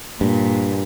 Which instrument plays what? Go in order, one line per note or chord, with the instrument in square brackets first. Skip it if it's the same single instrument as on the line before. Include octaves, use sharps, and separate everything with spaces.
[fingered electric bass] G2 [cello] A#2